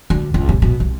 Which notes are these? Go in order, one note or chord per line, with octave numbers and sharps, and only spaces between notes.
D2
C#2
C3
B2
C2